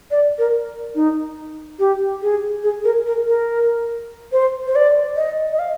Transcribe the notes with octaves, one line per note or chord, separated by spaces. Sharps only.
D5
A#4
D#4
G4
G#4
G#4
A#4
A#4
A#4
C5
C5
D5
D#5
D#5
F5